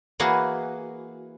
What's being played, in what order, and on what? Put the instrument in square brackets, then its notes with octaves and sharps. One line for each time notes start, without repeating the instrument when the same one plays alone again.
[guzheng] E3 A#3 F#4 G#4